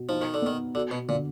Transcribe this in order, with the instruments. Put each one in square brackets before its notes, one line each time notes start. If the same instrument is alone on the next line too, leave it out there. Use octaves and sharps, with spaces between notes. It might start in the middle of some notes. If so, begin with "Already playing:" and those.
Already playing: [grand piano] B2
[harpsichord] F3 [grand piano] D#4
[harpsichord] D#3
D3
[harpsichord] D#3 [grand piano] B3
[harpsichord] D3 [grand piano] F#4
[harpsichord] B2
[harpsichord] A#2 [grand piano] D3